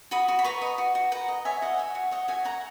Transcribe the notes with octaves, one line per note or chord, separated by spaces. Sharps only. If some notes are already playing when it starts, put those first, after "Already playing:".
F#4 B5 D#6
F#4
B5
B4 A#5 C#6
D#5
F#4
F#4
B4 F#5 A#5
D#5
C#5 E5 G#5
F#4 D#5 F#5
C#5 E5
F#4
C#5 D#5 F#5
F#4 E5 G#5
C#5 F#5 A#5